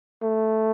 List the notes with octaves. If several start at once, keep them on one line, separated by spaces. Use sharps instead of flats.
A3